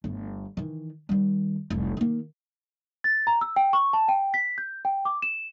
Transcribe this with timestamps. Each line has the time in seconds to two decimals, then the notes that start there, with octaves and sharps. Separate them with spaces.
0.04 G1 A3
0.57 D#3 E3
1.09 D#3 G3
1.70 F1 C2
1.97 D#3 A#3
3.04 A6
3.27 A#5
3.41 E6
3.56 G5
3.73 C#6
3.93 A5
4.08 G5
4.34 B6
4.58 G6
4.85 G5
5.05 D6
5.22 E7